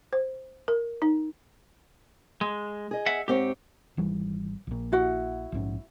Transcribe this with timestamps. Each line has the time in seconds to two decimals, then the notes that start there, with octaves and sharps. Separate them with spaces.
0.13 C5
0.68 A#4
1.02 D#4
2.41 G#3
2.91 G#4 D#5
3.06 E5 F#5
3.28 G#2 C4 G4 C#5
3.97 G#1 E3 G3
4.67 A#1 A#2
4.92 E4 F#4 F#5
5.52 A#1 G#2 C#4